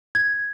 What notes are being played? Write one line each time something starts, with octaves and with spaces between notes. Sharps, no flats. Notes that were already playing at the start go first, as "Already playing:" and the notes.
G#6